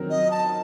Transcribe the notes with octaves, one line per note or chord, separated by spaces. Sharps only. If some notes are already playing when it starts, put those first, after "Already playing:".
Already playing: D#3 F#3 C4 A#4
D#5
A5